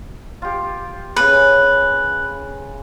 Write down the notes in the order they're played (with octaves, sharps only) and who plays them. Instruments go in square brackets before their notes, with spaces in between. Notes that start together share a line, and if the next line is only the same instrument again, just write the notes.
[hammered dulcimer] F4 G4
[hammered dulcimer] C#3 G#5 [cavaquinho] B4